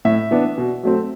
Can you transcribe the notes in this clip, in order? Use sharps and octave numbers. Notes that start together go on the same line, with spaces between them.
A2 E5
E3 B3 D4
B2
F#3 A3 C4